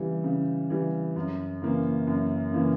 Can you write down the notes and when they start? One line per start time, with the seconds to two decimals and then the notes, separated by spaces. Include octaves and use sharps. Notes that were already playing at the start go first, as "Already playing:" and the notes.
Already playing: C#3 E3 G3
0.24 C#3
0.70 E3 G3
1.16 F#2
1.62 C#3 E3 A#3
2.07 F#2
2.52 C#3 E3 A#3